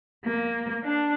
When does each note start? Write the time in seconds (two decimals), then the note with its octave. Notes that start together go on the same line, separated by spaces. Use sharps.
0.25 A#3
0.83 D4